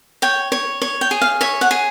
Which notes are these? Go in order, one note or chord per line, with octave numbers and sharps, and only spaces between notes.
C#5 G5
C#5
C#5
G5
G#4
F5
C#5 E5
F#5
G#4